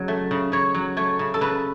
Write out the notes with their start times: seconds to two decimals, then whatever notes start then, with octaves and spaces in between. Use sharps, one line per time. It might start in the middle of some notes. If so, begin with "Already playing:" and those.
Already playing: C#3 F#3
0.08 A3
0.31 C#3
0.52 C#3 C#5
0.75 F#3
0.97 A3 C#5
1.19 C#3
1.34 A4
1.41 C#3 B4